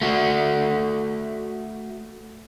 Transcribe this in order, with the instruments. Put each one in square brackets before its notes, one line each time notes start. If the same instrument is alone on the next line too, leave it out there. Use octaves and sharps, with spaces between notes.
[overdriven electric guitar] A3 F#4